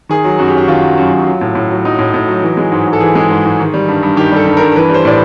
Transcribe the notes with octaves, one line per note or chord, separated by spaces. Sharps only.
D#3 G#4
F#3
F#2 F#4
G4
F#2 F#4
D#3 F4
F#3
F#2
F#2
F#3
A2
A2
F#3
F#3 D#4
A2
A2
F#3
E3
G#3
G#2
G#2
A4
E3 G#4
G#3
G#2
G#2
D#3
G3
G2
G2
D#3 G4
G3 A4
G2
G2 A#4
E3 B4
G3 C5
A2 D5